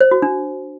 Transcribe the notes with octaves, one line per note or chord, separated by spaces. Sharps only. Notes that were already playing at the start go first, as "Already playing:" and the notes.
C5
F#4
D4